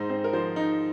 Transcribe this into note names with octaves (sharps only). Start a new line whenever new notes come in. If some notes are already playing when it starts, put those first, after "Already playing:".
Already playing: G#2 D#4 C5
C4
A#4
F3 C5
D#4